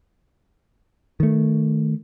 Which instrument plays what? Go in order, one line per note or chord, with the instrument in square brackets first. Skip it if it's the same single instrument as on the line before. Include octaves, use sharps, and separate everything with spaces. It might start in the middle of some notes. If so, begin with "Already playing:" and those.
[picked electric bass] D#3 A3